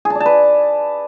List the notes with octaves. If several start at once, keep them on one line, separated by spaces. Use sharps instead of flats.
G#4
A5
D5
A5
B4